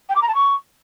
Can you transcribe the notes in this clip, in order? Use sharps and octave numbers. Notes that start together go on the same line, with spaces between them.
G5
D6
A#5
A5
C#6